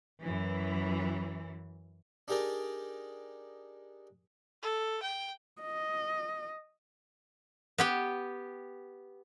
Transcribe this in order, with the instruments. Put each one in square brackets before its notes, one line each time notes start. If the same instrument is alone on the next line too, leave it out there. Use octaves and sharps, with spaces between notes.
[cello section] F#2 E3
[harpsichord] D4 D#4 G4 G#4 A#4 D5
[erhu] A4
G5
[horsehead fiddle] D#5
[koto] B3 G4 G5